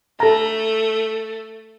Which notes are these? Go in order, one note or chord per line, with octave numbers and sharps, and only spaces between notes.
A3 A4 A#5